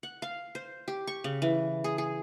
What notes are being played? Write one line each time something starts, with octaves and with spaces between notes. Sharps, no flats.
F#5
F5
C5
G4
C#6
C#3
E3
G#4
G#4